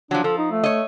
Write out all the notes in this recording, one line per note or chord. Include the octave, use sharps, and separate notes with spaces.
F3 F#3 D4
F3 A4
D#4
A3
C#5 D#5